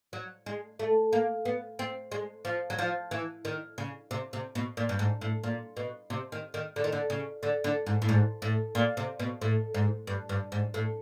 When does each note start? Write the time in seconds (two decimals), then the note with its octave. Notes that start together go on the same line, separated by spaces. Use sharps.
0.13 F#3
0.46 G#3
0.79 A3
1.13 A#3
1.45 B3
1.79 C4
2.12 G#3
2.45 F3
2.70 F#3
2.79 F3
3.11 E3
3.45 D#3
3.78 C#3
4.11 C3
4.33 C3
4.55 B2
4.77 A#2
4.89 G2
4.99 G#2
5.21 A2
5.44 A#2
5.77 B2
6.10 C3
6.32 D#3
6.54 D#3
6.76 D3
6.84 D#3
6.92 D3
7.10 C#3
7.43 D3
7.64 D3
7.86 G#2
8.02 A2
8.09 G#2
8.42 A2
8.75 A#2
8.97 C3
9.19 B2
9.41 A2
9.74 G#2
10.07 G2
10.29 G2
10.52 G#2
10.74 A2